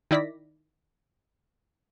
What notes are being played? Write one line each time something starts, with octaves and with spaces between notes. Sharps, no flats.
D#3 E4 D5 A#6 B6